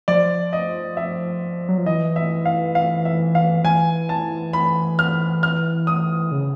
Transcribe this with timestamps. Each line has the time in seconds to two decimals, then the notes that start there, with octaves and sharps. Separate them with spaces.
0.08 F3 D5
0.53 D#5
0.97 E5
1.69 F#3
1.78 F3
1.86 E3 D#5
2.16 E5
2.45 F5
2.75 F5
3.05 E5
3.35 F5
3.64 E3 G#5
4.09 A5
4.53 B5
4.99 F6
5.43 F6
5.87 D#6
6.32 C#3